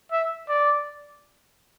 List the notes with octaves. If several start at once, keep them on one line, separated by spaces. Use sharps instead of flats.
E5
D5